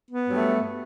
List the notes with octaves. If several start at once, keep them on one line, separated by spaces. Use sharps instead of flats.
B3
G2 F#3 A3